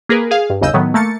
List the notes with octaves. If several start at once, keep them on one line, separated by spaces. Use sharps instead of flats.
A#3 G#4 A#4 B4
G#4 F5
G2
G1 D#2 C#3 D#5 E6 G6
A2 D#3 F#3 B3
A3 A#3 A6 C#7